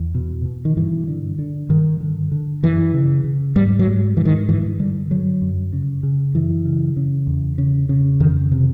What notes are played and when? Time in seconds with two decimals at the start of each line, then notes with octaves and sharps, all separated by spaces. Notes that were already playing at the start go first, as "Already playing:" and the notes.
Already playing: E2
0.15 B2
0.45 B2
0.65 D#3
0.77 G2 E3
1.08 D3
1.39 D3
1.69 G2 D#3
2.01 D3
2.32 D3
2.63 F#2 E3
2.94 C#3
3.24 C#3
3.56 G#2 G3
3.79 F#3
3.87 G#2
4.17 G#2 E3
4.25 D#3
4.49 G2 E3
4.79 D3 G3
5.11 D3 F#3
5.42 F#2
5.73 C#3
6.03 C#3
6.34 F#2 E3
6.65 C#3
6.97 C#3
7.27 E2
7.58 C#3
7.89 C#3
8.20 F2 D#3
8.52 C3